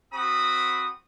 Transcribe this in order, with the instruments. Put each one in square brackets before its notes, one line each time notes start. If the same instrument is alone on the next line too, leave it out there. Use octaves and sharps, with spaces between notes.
[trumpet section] C4 F#4 B5 D#6